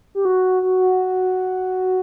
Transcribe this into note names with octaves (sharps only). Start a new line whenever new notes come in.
G4
F#4
F#4